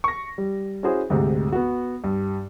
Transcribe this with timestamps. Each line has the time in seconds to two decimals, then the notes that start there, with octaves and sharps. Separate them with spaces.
0.04 C#6 A#6
0.38 G3
0.83 C#4 E4 F#4 G#4 C5
1.10 D2 G#2 C3
1.52 B3 F#4
2.04 G2